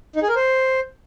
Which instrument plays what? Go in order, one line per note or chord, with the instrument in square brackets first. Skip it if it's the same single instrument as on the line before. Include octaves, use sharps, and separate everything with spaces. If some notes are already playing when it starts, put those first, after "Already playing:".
[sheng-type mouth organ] D#4
G#4
A#4
C5